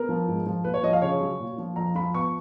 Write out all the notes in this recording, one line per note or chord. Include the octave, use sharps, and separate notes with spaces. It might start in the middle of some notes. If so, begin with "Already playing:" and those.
Already playing: B3 A#4
F3
G#2
F3
A#2 B4
C#5
F3 D#5
F5
C#3 C#5
F#3
A#2
F3
F2 A#5
F3 B5
B3 C#6